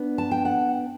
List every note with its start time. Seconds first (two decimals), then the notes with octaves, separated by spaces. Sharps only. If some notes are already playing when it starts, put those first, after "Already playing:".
Already playing: B3 D4
0.18 A5
0.31 G5
0.45 F#5